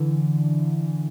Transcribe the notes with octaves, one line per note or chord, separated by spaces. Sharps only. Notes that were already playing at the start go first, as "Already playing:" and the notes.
Already playing: D3 E3